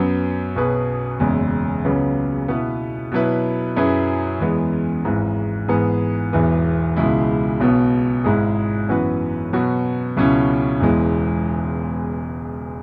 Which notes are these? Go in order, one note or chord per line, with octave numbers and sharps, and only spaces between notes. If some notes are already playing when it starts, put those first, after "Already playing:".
Already playing: F#2 F#3 B3
B1 B2 B3 G#4 B4
F#1 E2 C#3 G#3
C#2 C#3 F#3 B3
B2 B3 E4 B4
B2 F#3 E4 B4
F#2 F#3 E4 G#4 B4
E2 E3 G#3 B3
G#1 G#2 E3
G#2 E3 B3 G#4
E1 E2 E3 B3
C#2 B2 G#3 E4
B1 B2 B3
G#1 G#2 G#3 E4 G#4
F#2 E3 B3 F#4 B4
B2 F#3 B3 F#4 B4
C#2 B2 F#3 C#4 E4
E1 E2 E3 G#3